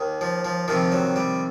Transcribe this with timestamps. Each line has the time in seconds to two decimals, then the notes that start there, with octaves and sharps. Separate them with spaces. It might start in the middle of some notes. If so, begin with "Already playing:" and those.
Already playing: D#2 D#3
0.21 F3
0.45 F3
0.68 F2 C3 D#3 F3
0.92 F#3
1.16 G3